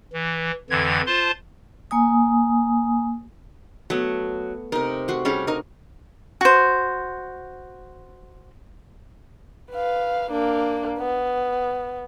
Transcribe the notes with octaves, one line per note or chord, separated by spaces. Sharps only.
E3
F2 D3 E3 G#6
F4 C5 A5 C6
A#3 G#5 D#6
F#3 A3 B3
C3 D#4 A#4
A3 F#4 C6
G3 C#4 G#4
D#4 A#4
F#4 C5
B4 F5
A#3 D4
B3